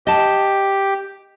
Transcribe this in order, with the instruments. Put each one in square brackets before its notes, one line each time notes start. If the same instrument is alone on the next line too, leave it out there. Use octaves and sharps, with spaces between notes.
[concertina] G4 [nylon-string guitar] D#5 A5